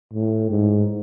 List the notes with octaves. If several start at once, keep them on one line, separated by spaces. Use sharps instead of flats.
A2
G#2